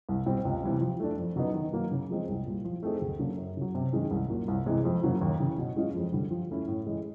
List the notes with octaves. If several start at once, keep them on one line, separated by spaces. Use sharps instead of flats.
C2
B2 G3 C4
C#2
C3 E3 G3
F3
A3 D4
F2
C#3 F#3 B3 D#4
D#3
F#3 A#3
C#3
F3 G#3 C4
C2
A#2 G3
F3
A3 C4 D#4 G#4
D2
C#3 F#3 A#3 D4
F#2
C#3 F#3
C3
D#3 G#3 C#4
C2
A#2 F#3 A#3
C2
C3 E3 G#3
F2
C#3 F#3 A#3
D#2
C#3 E3
B2
G#3 C#4 F4 G#4
F2
D3 G3
F3
A3 C#4 E4
A2
E3 G#3